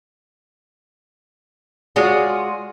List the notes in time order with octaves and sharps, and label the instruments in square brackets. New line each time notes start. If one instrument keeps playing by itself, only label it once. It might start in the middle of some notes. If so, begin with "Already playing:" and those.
[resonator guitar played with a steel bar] G#3 F4 F#4 G#4 C#5 D5